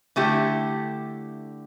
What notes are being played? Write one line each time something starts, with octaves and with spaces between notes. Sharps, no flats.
D3 A3 E4 G4